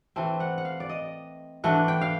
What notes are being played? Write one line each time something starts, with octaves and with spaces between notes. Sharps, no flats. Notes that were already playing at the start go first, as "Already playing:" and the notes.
E3 A3 C4
F#5
F#5
F5
D5
D#5
E3 A3 D4 F#5
G5
F5